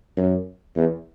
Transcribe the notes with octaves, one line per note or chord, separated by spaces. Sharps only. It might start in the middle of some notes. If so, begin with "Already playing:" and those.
F#2
E2